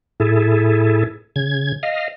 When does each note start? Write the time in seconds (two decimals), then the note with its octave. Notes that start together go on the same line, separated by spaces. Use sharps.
0.20 A2 E4 G#4 A4
1.36 C#3 G#6
1.83 D#5 F5